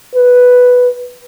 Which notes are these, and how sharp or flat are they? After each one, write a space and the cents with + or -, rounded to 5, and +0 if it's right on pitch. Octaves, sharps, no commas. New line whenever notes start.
B4 +0